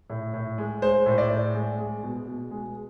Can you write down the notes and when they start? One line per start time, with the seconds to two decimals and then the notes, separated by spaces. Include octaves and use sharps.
0.10 A2
0.34 A2
0.58 G#3
0.82 G#3 C5
1.06 A2
1.18 D5
1.31 A2
1.54 G#3
1.79 G#3
2.03 B2
2.27 B2
2.51 G#3